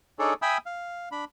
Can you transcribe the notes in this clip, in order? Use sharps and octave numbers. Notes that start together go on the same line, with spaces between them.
D4 D#4 G#4 A4 C#5 D5
E5 G5 G#5 B5 D#6 E6
F5
D4 B5